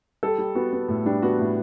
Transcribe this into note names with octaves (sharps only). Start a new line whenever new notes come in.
G3 A4
G3
B3 F#4
B3
A2
G3 D4
B3 F#4
A2